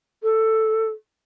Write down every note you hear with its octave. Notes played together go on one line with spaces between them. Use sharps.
A4